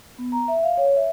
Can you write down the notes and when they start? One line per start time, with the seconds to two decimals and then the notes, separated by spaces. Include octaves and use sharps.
0.18 B3
0.32 A#5
0.48 E5
0.63 F5
0.77 C#5
0.96 E5